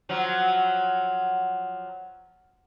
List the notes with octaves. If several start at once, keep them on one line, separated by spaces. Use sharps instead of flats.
F3 F#3